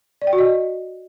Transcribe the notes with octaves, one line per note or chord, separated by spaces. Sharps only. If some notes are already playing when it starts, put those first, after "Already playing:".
D5
G5
F#4
D#5